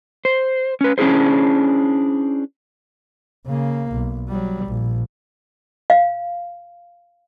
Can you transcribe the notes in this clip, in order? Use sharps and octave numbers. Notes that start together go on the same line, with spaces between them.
C5
C#4 B4
C#4 D4 E4 G#4 C5
C#3 A#3
B1
F#3 G3
A#1
F5